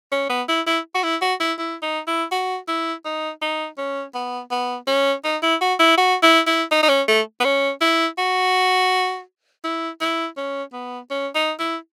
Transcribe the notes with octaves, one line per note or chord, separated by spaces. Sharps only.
C#4
B3
E4
E4
F#4
E4
F#4
E4
E4
D#4
E4
F#4
E4
D#4
D#4
C#4
B3
B3
C#4
D#4
E4
F#4
E4
F#4
E4
E4
D#4
D#4
C#4
A3
B3
C#4
E4
F#4
E4
E4
C#4
B3
C#4
D#4
E4